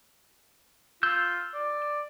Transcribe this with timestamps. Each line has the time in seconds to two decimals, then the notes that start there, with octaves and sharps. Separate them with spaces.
1.03 F4 E6 G6
1.54 D5